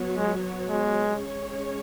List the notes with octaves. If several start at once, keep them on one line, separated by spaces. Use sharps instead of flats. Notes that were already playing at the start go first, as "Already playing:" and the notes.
Already playing: F#3 B3 F#4 C#5
G#3
G#3
G#3 C#4 G#4 C#5